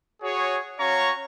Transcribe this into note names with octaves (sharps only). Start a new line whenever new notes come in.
F#4 G#4 C#5
C#4 F#4 C#5 F5 A#5 C#6